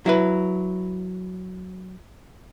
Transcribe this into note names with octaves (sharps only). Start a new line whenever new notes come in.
F#3 E4 B4